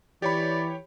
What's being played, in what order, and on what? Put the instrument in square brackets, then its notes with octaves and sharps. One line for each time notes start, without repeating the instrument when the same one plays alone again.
[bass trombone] E3 [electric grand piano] G4 C#5 B5 [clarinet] D5